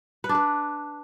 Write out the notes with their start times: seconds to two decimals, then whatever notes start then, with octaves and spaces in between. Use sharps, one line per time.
0.24 B4
0.29 D4
0.35 B4